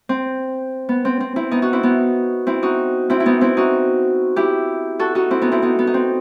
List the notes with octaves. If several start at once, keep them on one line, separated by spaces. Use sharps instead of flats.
C4
B3
C4
C4
C4 E4
B3 D#4
D#4 F#4
C4 E4
B3 D#4
C4 E4
D#4 F#4
C4 E4
E4
B3 D#4
C4 E4
D#4 F#4
E4 G4
F#4 A4
D#4 F#4
C4 E4
B3 D#4
C4 E4
B3 D#4
B3
D#4
C4